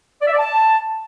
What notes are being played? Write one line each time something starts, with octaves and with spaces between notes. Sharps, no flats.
D5
E5
D5
A5